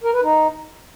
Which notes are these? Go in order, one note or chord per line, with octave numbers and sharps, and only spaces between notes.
A#4
B4
D#4